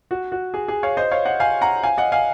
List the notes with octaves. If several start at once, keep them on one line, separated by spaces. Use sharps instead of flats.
F#4
F#4
G#4
G#4
C#5 F5
C5 D#5
C#5 F5
D#5 F#5
F5 G#5
F#5 A#5
F5 G#5
D#5 F#5
F5 G#5